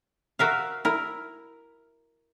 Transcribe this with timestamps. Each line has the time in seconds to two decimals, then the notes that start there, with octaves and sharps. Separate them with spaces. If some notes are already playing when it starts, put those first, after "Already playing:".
0.39 F#4 A#4 E5 F5
0.85 E4 A#4